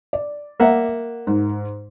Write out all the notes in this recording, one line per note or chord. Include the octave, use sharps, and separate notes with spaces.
D5
A#3 E5 F#5
G#2